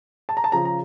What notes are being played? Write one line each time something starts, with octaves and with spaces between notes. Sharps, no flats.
A5
A#5
A5
C#3 F3 A#5
A#5